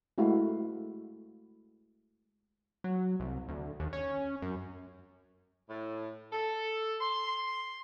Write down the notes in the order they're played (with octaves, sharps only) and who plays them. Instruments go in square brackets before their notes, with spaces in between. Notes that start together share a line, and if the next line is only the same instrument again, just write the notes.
[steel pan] G#3 A3 E4 F#4 F5
[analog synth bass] F#3
C2
D2
D#2
C#4
F#2
[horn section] A2
A4
C6